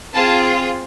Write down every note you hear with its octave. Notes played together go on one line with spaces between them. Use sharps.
C4 F4 G#4 A5